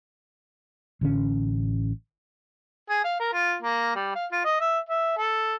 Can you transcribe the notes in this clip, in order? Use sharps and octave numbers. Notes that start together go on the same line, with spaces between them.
A1 D3 C#4
G#4
F5
A#4
F4
A#3
G3
F5
F4
D#5
E5
E5
A4